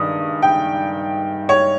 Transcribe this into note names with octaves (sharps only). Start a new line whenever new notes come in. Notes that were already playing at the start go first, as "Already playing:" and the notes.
Already playing: G2 D#3 G#3 D#6
G5
C#5